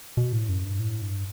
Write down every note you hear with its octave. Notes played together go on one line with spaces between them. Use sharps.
B2
A2
F#2
G2
A2
G2